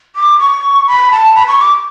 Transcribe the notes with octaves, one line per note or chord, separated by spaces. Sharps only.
D6
C#6
B5
A5
B5
C#6
D6